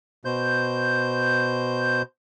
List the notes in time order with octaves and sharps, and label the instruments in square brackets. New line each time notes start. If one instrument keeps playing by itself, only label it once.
[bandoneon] B2 C5 G6